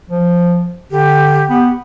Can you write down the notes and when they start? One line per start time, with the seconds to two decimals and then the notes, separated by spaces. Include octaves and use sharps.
0.10 F3
0.91 D3 G4
1.50 B3